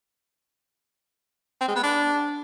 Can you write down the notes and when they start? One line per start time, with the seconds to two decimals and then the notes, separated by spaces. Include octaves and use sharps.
1.61 C4
1.68 G#3
1.76 B3
1.83 D4